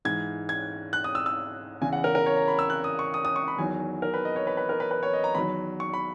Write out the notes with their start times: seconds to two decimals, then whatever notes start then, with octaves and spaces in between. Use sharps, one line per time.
0.05 G#2 E3 G#6
0.49 G#6
0.93 F#6
1.04 D#6
1.15 E6
1.26 E6
1.81 E2 C#3 E3 G#5
1.93 F#5
2.04 A#4
2.15 A#4
2.26 C#5
2.36 A#5
2.48 B5
2.59 E6
2.70 F#6
2.84 D#6
2.99 C#6
3.14 D#6
3.25 D#6
3.36 C#6
3.48 B5
3.58 E2 D#3 F#3 G#5
4.02 A#4
4.14 B4
4.25 D#5
4.36 C#5
4.47 B4
4.57 B4
4.69 A#4
4.80 B4
4.91 B4
5.03 C#5
5.13 D#5
5.24 A#5
5.35 E2 D#3 F#3 B5
5.80 C#6
5.94 B5